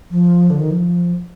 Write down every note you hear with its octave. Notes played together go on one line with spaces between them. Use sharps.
F3
D3
D#3
F3